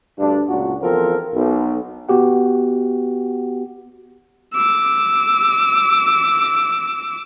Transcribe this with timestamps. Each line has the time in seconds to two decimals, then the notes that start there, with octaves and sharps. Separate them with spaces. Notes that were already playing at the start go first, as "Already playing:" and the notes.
0.19 D2 G2 D4
0.48 C#2 A#2 D4 F#4
0.82 E2 F3 C4 A4 A#4
1.35 B1
2.09 B3 F#4 G4 F#5
4.54 D6 E6